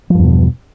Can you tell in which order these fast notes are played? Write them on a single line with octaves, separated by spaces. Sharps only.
F3 G2 E2 B2